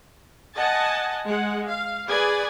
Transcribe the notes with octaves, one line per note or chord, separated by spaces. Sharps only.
D#5 F#5 G#5 A5
G#3 F#5
F5
G#4 B4 D5 G#5